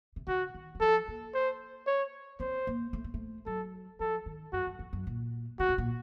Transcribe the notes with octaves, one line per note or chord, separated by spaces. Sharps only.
C3
C#3 F#4
D#3
F#3
F3 A4
A#3
C5
C#5
C4 C5
A#3
A3
A#3
A3
F#3 A4
F3 A4
D#3
F#2 F#4
F#2
F2
F#2
A#2
C#3 F#4
C3
A#2